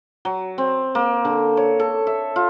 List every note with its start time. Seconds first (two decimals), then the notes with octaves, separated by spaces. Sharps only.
0.25 F#3
0.58 C4
0.95 A#3
1.25 D3
1.57 C#5
1.80 A4
2.07 E5
2.36 F4